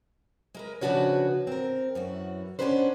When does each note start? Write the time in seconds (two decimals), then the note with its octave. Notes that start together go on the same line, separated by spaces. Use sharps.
0.55 G#3 A#4 B4
0.81 C#3 F3 D4 F#4 B4 C#5
1.47 C4 A#4
1.95 F#2 E3 F#4
2.59 B3 C#4 D4 G4 B4 C5